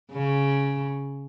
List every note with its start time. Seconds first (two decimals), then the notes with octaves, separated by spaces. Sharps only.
0.12 C#3